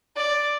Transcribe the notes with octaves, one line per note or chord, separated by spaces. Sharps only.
D5